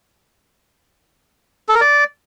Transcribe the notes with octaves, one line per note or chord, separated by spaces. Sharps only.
A4
A#4
D5